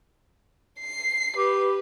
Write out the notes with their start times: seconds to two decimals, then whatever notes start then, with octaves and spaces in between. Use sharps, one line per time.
0.80 C7
1.36 G4 B4